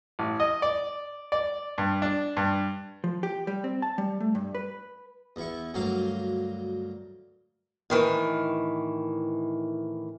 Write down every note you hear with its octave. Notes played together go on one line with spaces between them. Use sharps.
A1
D#5
D5
D5
G2
D4
G2
F3
G4
G3
C4
A5
G3
A3
G2
B4
E2 E4 C#6
D2 G2 F#3 A#3 F5
A2 D#3 E3